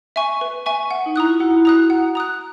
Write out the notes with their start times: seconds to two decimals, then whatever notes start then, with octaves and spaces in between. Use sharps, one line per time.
0.16 E5 G#5 C#6
0.41 B4
0.66 E5 G#5 C#6
0.91 F#5
1.06 D#4
1.16 E4 A#5 D#6 F#6
1.29 F4
1.40 E4 F#4 F#5
1.65 A#5 D#6 F#6
1.90 F#5
2.15 A#5 D#6 F#6